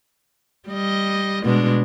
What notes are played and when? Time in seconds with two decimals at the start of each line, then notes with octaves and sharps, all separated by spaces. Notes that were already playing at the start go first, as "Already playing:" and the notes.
0.69 G3 D#5
1.45 B2 G#3 D4